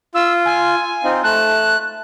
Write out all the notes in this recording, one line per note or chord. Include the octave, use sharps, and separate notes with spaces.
F4 E6
G#5
C4 D#4 F4
A3 A5 F#6